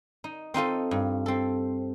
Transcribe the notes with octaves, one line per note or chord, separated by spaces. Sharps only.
D#4
C4 D#4 F4 A4
G2
C4 A4